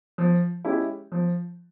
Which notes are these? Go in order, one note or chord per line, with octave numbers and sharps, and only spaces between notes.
F3
G#3 C#4 E4 G4
F3